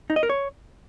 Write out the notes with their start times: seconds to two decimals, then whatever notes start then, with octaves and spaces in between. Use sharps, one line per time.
0.10 D#4
0.16 D#5
0.23 A#4
0.29 C#5